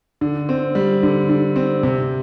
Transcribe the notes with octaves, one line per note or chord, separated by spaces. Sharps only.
D3
C4
G3
D3
D3
C4
C3